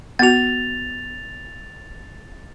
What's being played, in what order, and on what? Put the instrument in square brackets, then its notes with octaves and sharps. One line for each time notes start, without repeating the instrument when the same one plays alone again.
[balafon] B3 F#4 [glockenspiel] A6 F7